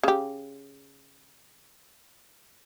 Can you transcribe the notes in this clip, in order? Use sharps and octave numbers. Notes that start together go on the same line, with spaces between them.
C#3 G4